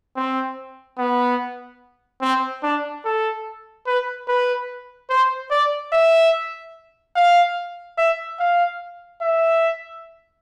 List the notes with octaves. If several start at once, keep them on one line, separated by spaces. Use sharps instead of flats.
C4
B3
C4
D4
A4
B4
B4
C5
D5
E5
F5
E5
F5
E5